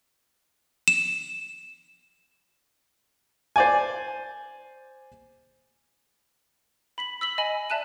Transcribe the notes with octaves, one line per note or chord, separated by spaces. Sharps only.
E7
C5 D5 G#5
B5 B6 F#7
E6 B6 F#7 G7
D#5 G#5 B5
D5 E5 A5 F#6 D#7 F#7